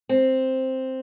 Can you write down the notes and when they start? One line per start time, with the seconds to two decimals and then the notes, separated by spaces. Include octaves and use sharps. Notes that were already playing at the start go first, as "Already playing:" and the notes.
0.09 C4